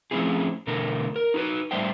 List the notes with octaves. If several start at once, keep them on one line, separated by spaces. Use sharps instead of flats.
F3 A3 C4 C#4 E4 G#4
E2 B2 D3 A3 D4 A#4
A#4
D#4 F#4 G#4 B4
A2 G3 D4 C5 E5 G5